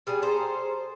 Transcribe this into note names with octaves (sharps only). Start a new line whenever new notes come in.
G3 G#4 D5 G#5
G#4 A4 C5 A#5